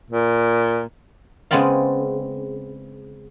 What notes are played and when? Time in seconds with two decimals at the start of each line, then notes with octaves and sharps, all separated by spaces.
0.10 A#2
1.51 C#3 G#3 B3 C4 D5 F5